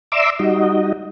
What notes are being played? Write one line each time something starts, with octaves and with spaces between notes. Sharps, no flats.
D5 E5 A#5 C6 D6 E6
G3 D#4 F#4 D#5